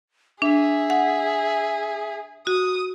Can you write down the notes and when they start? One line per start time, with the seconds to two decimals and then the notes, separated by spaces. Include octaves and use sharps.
0.42 D4 G#4 E5
0.90 F#5
2.47 F#4 D#6